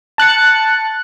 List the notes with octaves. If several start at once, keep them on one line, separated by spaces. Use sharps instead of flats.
A5 F#6 A6 C#7